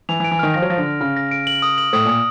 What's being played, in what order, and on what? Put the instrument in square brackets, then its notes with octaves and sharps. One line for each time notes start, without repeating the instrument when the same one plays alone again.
[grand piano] E3 [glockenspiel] F7
[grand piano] E3
[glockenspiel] D7
[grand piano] E3
[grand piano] D#3 [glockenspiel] F6
[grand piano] F3 [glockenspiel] A#6
[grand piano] F#3
[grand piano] F3 [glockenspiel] A#6
[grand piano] D3
[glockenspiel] F6
[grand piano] C#3 [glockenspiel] F6
[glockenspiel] A#6
D7
F#7
D#6
F#7
[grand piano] A2 [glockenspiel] D#6
[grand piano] A#2 [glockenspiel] D#6